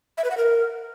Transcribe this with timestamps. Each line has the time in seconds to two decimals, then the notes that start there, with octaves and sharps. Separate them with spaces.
0.18 E5
0.24 B4
0.31 F#5
0.37 A#4